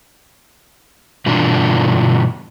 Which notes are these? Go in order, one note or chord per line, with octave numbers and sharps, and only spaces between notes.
G2 B2 D3 E3 D4 F4